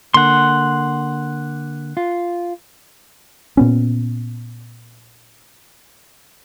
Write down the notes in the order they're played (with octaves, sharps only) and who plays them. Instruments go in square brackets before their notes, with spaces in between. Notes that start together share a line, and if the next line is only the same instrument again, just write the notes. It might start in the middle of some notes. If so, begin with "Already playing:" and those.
[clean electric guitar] D3 A#3 [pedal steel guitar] F#5 C6
[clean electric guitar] F4
[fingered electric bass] A#2 B3 C#4